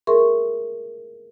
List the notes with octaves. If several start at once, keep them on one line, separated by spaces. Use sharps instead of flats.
G#4 A#4 E5 C6 C#6